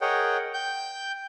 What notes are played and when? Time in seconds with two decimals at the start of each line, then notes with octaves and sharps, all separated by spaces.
0.01 G#4 A#4 C#5 D#5 F#5 G5
0.54 G5 G6